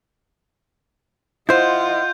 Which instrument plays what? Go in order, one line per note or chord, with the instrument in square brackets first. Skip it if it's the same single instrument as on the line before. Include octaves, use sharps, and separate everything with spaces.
[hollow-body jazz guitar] E4 C5 [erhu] F4 [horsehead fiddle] D#5 F#5 [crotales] G6